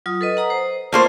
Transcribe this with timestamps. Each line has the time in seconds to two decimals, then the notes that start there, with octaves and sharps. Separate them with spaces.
0.06 F#3 F4 D#6
0.21 A4 B4 D#5
0.37 F#5 A#5 D#6
0.50 C5
0.93 A3 A#3 F4 C5